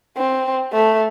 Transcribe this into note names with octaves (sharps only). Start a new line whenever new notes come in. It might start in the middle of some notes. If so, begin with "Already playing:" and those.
C4
A3